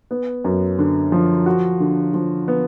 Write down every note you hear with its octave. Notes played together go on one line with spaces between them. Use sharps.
B3
F#2
D3
F3
F#4
D3
F3
B3